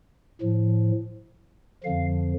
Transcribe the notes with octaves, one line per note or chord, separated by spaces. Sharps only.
A2 F3
F2 D3 F3 F5